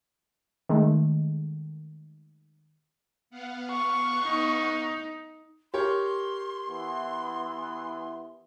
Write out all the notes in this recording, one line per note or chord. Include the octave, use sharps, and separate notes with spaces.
D#3 G#3 A3
B3 F5 F#5
C#6
D#4
G4 A#4 C#5 C6
E3 B3